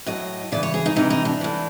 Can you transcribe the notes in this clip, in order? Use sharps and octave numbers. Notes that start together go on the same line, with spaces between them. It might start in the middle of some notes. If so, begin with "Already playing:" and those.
A2 F#3 D#5
C#3 E3 D5
C#5
G#4
D#4
C3 E3 D#4
D#4
D4
A2 E3